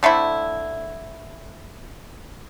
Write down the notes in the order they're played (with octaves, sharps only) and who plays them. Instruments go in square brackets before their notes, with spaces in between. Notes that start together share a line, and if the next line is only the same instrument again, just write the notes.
[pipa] D3 A3 C4 E4